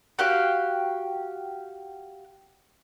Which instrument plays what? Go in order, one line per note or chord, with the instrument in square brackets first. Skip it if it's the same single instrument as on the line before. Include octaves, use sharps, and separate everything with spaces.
[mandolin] F#4 G4 F5 G5